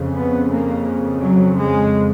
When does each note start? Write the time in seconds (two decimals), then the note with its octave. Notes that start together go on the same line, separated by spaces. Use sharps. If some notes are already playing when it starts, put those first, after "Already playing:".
Already playing: F2 C#3
0.15 B3
0.50 A#3
1.22 F#3
1.58 G#3